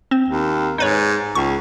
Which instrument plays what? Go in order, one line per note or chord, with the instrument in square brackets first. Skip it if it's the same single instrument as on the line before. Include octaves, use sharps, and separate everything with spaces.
[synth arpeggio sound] C4
[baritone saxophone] D#2
[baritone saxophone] G#2 [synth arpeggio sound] D#4 B4 C#5
[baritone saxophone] C#2 [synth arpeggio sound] C#6